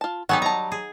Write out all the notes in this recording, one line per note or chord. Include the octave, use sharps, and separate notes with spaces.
F4 A5
F#3 B3 D#4 G4 G#4 F#5
G3 A5 A#5
G#4